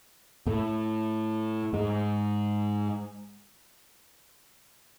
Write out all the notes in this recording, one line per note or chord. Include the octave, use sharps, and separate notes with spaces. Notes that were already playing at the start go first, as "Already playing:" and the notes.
A2 A3
G#2 G#3